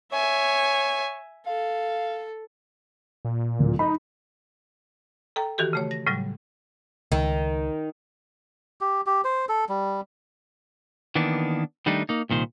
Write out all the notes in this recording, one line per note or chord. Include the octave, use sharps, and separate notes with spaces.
C#5 E5 G#5
A4 F5
A#2
D1
D#4 B5
A4 G5 A#5
D#3 E3 F#4 G4 A4
C#3 A3 C#5
A#6
A2 C#3 F#3 G3
C#2 D#3
G4
G4
C5
A4
G3
D#3 E3 A#3 B3 D4
D#3 G3 A3 D4 D#4
A#3 D#4
C2 A#2 D#3 C5